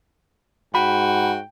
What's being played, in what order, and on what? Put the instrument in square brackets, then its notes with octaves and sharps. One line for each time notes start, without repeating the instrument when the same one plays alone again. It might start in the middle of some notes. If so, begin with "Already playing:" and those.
[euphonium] G#2 [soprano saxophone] F#4 [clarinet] G5 [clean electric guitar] B5